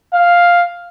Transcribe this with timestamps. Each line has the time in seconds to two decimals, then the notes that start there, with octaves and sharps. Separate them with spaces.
0.14 F5